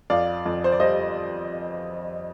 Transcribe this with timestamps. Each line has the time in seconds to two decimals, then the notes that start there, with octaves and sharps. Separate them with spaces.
0.10 F2 D5 F5
0.46 F2
0.64 C5
0.72 D5
0.80 G3 C5 D#5